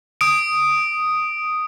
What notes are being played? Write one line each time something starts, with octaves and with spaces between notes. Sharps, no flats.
D#6 D7